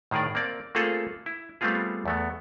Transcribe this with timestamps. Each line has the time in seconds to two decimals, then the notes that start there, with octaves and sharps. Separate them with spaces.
0.11 A2 D#3 G#4 A#4 D5
0.35 A#3 C4 D5
0.75 A3 A#3 C4 F4 G#4 A4
1.26 E4
1.61 G3 A3 B3 C4 F4 G#4
2.06 E2 A3 B3